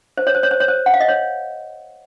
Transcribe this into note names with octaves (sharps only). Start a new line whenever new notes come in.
C5
C#5
C5
C#5
C5
C#5
C5
F#5
F5
D#5
C#5